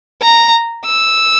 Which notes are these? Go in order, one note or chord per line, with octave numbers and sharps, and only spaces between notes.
A#5
E6